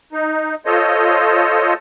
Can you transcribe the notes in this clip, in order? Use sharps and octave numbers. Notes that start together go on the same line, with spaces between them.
D#4
F4 A4 C5 C#5 D#5